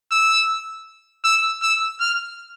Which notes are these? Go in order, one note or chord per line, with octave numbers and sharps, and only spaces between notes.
E6
E6
E6
F6